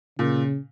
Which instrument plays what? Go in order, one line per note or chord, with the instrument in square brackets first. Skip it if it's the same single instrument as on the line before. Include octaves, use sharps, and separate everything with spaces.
[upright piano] A#2 [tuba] C#3